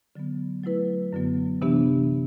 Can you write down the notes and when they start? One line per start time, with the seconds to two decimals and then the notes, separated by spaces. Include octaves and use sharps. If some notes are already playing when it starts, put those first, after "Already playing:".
0.15 D3 F#3 B3
0.63 F#3 A3 E4 B4
1.13 F#2 D3 F#3 B3
1.62 C3 E3 B3 D4 G4